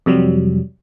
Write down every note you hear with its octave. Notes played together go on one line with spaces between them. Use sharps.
F2 C3 F#3 G3